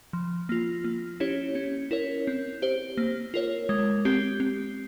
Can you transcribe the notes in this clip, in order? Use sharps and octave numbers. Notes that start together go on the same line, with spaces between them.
F3
A#3 F4
A#3
C#4 E4 G4 C#5
C#4
E4 A#4 C#5
C4
G4 C5
A#3
F4 A#4 C#5
G#3
C4 G4
C4